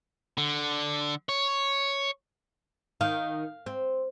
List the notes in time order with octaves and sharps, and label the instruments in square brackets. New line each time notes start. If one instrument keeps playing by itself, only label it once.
[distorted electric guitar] D3
C#5
[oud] D#3 [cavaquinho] F5
[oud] C4